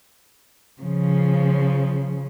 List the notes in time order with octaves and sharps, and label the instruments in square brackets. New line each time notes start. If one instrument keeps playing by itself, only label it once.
[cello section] C#3 F3